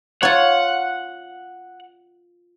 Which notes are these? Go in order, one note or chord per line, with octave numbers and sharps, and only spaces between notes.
F4 C#5 F#5